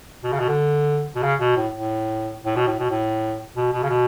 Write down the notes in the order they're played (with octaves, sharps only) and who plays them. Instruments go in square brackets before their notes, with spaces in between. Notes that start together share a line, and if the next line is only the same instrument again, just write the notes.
[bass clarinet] B2
C#3
B2
D3
B2
C#3
B2
A2
A2
A2
B2
A2
B2
A2
B2
B2
C#3
B2